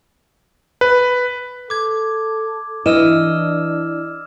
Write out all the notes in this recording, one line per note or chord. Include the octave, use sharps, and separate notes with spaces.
B4
A4 D6 G#6
E3 D4 D#5 E6 F6 E7